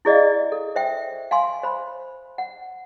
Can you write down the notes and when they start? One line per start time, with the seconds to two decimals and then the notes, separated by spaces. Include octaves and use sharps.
0.05 E4 G#4 D5 D#5 F5
0.52 A4
0.76 C5 E5 G5
1.31 F5 G#5 C6
1.63 C5 B5
2.38 F#5